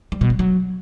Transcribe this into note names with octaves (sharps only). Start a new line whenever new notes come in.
G3
B2
G3
F#3